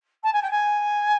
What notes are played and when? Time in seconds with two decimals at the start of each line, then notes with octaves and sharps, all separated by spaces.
0.23 A5
0.32 G#5
0.42 G5
0.50 G#5